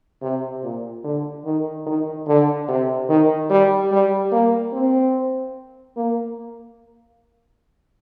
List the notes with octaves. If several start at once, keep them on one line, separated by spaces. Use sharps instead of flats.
C3
A#2
D3
D#3
D#3
D3
C3
D#3
G3
G3
A#3
C4
A#3